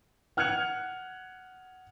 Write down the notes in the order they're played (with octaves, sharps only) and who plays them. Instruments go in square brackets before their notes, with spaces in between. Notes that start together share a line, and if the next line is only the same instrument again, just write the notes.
[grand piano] F#5 F6 F#6 G#6 C#7 F7